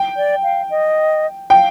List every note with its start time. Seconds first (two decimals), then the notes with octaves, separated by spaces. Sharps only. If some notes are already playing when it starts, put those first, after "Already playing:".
Already playing: G5
0.17 D5
0.43 F5
0.70 D#5
1.50 F5 G5